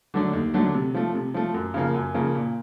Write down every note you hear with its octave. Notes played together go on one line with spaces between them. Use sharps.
D3 F#3 A3 D4
D#2
D3 F#3 A3 D4
C3
F3 A3
C3
F3 A3
F#2
C#3 F3 A#3
F#2
C#3 F3 A#3
A#2